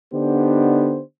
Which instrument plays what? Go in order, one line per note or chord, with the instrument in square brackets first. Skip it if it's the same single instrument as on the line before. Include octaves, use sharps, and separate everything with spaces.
[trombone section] D3 B3 D4 D#4 G4 C5